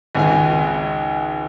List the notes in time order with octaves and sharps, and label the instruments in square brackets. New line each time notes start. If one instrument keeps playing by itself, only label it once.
[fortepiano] G#1 C#2 G#5